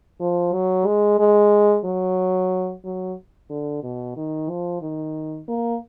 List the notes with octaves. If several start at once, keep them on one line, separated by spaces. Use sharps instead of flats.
F3
F#3
G#3
G#3
F#3
F#3
D3
B2
D#3
F3
D#3
A#3